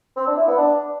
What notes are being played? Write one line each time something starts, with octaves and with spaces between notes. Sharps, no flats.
C4
D4
E4
B3
D4